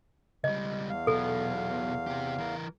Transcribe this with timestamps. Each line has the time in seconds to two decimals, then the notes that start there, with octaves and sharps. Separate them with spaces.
0.44 C#2 G3 D#5
0.90 E2 F5
1.07 B1 B2 A4
2.07 C3 G4
2.38 E3 A#4